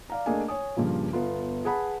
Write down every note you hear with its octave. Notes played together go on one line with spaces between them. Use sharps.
D5 F5 A#5
A3 A#3 D4 G#4 D#5 G#5
C#5 G#5 D#6
G2 A#2 C#3 F3
G1 B3 F4
G#4 B4 F#5 A5 B5